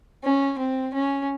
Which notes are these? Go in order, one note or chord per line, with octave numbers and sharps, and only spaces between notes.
C#4
C4
C#4